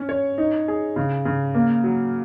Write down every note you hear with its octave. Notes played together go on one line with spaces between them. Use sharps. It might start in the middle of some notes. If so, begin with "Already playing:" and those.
Already playing: C#4
C#5
D#4
G#4
C#3
C#3
A#3
F#3